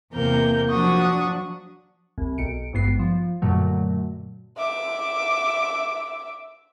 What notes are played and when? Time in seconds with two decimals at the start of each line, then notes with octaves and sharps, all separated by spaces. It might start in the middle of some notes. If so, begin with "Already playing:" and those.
0.11 E2 C3 A#3 A#4 G6
0.70 F3 F#3 D4 F#4 C#6 D#6
2.18 C2
2.38 B1 C#7 D7
2.73 G#1 G2 B3 C7
2.99 F3
3.42 F#2 A#2 D3 F#3 A3
4.57 E5 D6